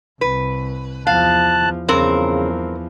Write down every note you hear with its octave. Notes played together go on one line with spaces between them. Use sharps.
C2 B4
E2 F3 F5 A5 F#6
E2 G2 C#3 F3 C4 A#4